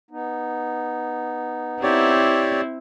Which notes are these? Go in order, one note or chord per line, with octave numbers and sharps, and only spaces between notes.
B3 D#4
C4 E4 G4 C#5 D5